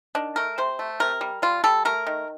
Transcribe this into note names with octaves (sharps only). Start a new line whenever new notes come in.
D#3 D4
A3 A#4
C3 C5
A3
C3 A#4
G3
G3 F4
G3 A4
A3 A#4
D#3